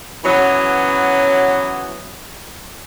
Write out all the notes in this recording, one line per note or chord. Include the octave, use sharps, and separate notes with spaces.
E3 F#3 B3 C#4